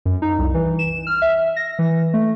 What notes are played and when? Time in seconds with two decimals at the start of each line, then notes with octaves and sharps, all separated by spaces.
0.06 F#2
0.22 D#4
0.38 C2
0.54 E3
0.79 E7
1.07 F6
1.22 E5
1.56 A#6
1.79 E3
2.14 A3